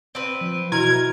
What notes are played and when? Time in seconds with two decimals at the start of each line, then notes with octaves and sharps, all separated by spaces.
0.15 C4 B4
0.41 F3
0.72 B2 E3 E4 F#4 A#4 G#6